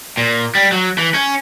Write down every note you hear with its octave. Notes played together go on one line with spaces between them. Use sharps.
A#2
G3
F#3
E3
C#4